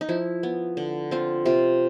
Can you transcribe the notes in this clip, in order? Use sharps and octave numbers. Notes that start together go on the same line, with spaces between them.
D#4
F3 E4
B3
D3
C4 F4
C3 F4